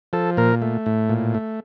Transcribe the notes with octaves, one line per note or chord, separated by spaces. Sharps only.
F3 A4
A#2 A#4
A3
A2
A#2
A3